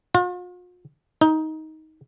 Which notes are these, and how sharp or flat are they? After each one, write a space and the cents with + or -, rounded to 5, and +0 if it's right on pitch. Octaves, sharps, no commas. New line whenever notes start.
F4 +45
D#4 +15